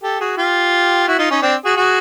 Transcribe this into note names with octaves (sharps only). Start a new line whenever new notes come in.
G4 A4
F#4 G#4
F4 G4
E4 F#4
D#4 F4
C#4 D#4
C4 D4
F#4 G#4
F#4 G#4